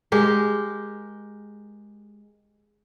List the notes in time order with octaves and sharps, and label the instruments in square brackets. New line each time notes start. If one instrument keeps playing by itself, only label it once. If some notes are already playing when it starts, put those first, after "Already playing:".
[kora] G#3 G4 A#4